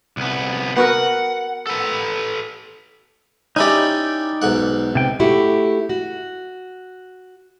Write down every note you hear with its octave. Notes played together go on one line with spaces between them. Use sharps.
C2 B3
B3 F#4 A#4 F#5
A4 B4
C#4 D#4 E4 G4 D5
B1 G#2 F#5
C3 G5
A3 E4 F#4 G4
F#4